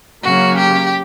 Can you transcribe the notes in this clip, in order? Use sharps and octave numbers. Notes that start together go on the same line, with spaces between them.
C#3 F#3 A#3 C#4 F#4
G4